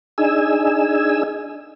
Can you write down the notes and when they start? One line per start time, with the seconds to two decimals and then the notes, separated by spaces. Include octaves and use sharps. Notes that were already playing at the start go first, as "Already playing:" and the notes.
0.18 D4 D#4 G#4 G#5 E6